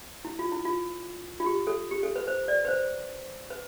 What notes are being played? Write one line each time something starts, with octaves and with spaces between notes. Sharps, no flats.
E4
F4
E4
F4
F4
G4
A4
G4
A4
B4
C5
D5
B4
C5
B4